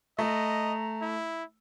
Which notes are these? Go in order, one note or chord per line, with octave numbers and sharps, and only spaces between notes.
A3 D#5 A#5
E4